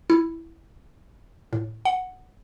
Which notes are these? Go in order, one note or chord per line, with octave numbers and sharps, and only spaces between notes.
E4
A2
F#5